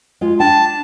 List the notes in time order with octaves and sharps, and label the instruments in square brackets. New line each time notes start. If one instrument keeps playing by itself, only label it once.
[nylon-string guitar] G#3 F4
[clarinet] D4 [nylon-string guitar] G5 [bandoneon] A5